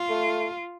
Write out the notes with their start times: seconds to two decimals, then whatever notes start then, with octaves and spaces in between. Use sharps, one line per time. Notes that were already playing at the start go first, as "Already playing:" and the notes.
Already playing: F4
0.09 A3